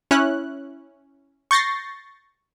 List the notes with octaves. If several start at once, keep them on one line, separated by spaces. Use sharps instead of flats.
C#4 E4 F#6
C#6 G6 A6 A#6 C7